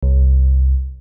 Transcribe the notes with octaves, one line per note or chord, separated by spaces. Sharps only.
C2